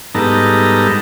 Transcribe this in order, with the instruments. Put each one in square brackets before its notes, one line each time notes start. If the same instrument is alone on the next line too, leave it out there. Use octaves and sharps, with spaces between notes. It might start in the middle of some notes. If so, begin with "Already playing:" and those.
[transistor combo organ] G#2 G3 B3 D#4 A4 A#5